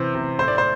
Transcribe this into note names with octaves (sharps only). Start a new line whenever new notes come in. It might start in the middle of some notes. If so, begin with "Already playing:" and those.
Already playing: C3 E3 C5
C3
A2 C5
D5
C5